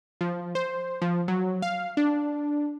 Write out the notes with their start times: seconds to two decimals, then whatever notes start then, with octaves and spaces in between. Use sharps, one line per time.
0.21 F3
0.55 C5
1.02 F3
1.28 F#3
1.62 F5
1.97 D4